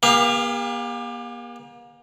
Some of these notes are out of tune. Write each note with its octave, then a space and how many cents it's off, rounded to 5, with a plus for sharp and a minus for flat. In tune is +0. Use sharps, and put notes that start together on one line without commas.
A#3 +40 G4 +45 F5 +0